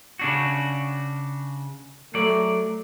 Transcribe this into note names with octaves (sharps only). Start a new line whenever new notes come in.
C#3 D4 F#4
F#3 A3 D5